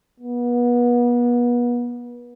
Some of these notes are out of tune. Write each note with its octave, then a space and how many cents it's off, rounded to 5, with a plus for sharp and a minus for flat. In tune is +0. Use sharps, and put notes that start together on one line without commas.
B3 -35